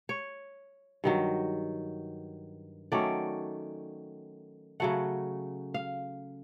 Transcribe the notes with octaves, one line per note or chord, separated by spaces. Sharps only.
C#5
G2 D#3 F#3
D#3 F#3 A3 C#4 D5
C#3 F#3 A3 F#5
F5